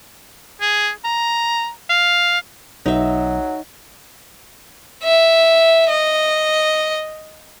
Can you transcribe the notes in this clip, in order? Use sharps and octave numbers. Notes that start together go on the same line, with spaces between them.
G#4
A#5
F5
B1 F#3 D#4 E5
E5
D#5